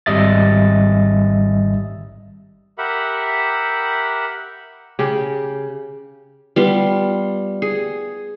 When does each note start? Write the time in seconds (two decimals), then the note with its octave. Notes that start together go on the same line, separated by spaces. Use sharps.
0.06 G#1 G3 D#5 E5 A6
2.78 G4 A#4 E5 F#5 B5
4.99 C#3 G4
6.56 G3 B3 F4
7.62 G#4